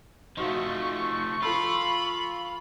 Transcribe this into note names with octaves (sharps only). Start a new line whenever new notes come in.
F3 A3 D#4 F#4 F5 C#6
F3 F4 A4 B5 E6